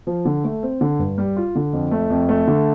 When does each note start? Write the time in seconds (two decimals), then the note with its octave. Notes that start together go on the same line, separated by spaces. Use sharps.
0.07 F3
0.25 D3
0.44 A3
0.63 C4
0.81 D3
0.99 G2
1.18 G3
1.36 F4
1.55 D3
1.73 F2
1.91 A3
2.10 F2
2.29 A3
2.47 D3